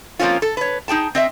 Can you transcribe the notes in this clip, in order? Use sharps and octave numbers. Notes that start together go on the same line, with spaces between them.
F3 A#3 C4 C#4 F4
A4
B4 C#5
D#4 G#4 G5 A5
C4 D#5 E5